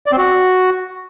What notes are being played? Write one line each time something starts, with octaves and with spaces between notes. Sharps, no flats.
D5
C4
F#4